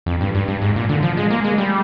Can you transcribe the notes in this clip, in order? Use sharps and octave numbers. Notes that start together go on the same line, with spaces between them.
F2
G2
G2
G2
G#2
A#2
D3
F3
G#3
A#3
G#3
G3